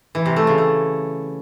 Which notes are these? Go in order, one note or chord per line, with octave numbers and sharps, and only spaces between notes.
E3
C3
A3
C#3
A3